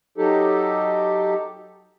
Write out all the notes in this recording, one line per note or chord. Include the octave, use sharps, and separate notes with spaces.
F#3 D#4 G4 A4